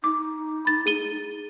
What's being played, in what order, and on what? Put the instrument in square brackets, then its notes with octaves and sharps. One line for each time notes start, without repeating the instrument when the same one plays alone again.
[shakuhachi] D#4 [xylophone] D6
[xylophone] B5 A6
G#4 D#7 G7